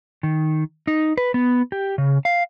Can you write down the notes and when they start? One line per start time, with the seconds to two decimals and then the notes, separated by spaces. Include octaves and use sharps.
0.23 D#3
0.87 D#4
1.18 B4
1.34 B3
1.72 G4
1.98 C#3
2.25 F5